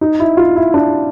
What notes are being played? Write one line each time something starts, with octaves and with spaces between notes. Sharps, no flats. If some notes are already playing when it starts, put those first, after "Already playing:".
D#4
E4
F4
E4
D4